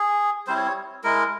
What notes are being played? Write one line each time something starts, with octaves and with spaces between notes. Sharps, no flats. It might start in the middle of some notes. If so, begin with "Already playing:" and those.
Already playing: G#4
G3 C4 E4 C5
C#5
C#5
G#3 E4 A#4